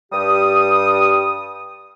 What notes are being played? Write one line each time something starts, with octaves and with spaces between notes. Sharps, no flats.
G2 G3 G4 D#6